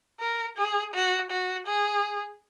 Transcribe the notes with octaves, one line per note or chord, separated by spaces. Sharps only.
A#4
G#4
F#4
F#4
G#4